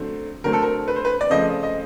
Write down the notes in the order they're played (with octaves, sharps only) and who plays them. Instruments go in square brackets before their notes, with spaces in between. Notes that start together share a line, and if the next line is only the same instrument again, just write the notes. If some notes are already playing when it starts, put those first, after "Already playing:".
Already playing: [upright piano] D3 F#3 A3 C4
D3 F#3 A3 C4 A#4
A4
A#4
B4
C5
B4
D5
C#3 F3 A3 C4 D#5
D#5